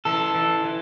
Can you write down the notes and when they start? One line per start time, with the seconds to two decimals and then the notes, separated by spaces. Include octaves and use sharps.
0.05 E3 A4
0.35 E3
0.65 E3